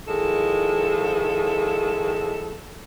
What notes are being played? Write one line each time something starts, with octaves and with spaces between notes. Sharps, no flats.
D#3 F3 G#3 E4 A4